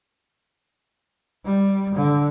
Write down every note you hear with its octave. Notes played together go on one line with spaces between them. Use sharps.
G3
D3